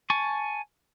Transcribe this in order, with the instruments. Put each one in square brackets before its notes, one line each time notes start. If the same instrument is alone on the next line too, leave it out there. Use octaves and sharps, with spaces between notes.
[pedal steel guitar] G#5 A5 C#6